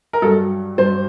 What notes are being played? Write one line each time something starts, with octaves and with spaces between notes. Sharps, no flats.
A#4
G2 F#3 A4
G2 F#3 C5